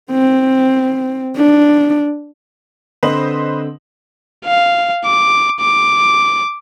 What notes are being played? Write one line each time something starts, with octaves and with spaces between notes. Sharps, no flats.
C4
D4
D3 C4 B4 C5 D#5 F#7
F5
D6
D6